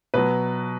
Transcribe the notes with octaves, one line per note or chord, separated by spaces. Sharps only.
B2 F#3 B4